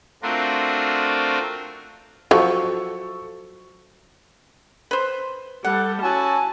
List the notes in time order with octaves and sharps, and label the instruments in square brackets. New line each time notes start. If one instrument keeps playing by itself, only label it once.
[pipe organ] A3 C4 D4 F4 F#4 A#4
[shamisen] F3 F#3 [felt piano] A4 C#6
[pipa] B4 C5
[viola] G3 [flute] A4 [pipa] F#5
[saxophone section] C#4 E4 F#4 [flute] G#5 [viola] A5